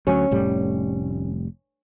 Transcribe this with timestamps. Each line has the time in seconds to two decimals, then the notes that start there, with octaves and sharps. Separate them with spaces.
0.07 D2 F#3 C#4
0.31 F1 A2 G3